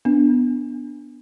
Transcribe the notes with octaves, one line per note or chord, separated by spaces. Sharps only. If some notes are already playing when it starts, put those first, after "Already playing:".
B3 D4